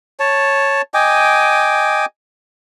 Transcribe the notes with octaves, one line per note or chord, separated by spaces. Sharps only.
C#5 A5
D#5 G5 G#5 D6